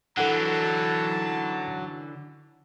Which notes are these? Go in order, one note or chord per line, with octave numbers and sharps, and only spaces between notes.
D3 E3 F#3 A4 F#5 A5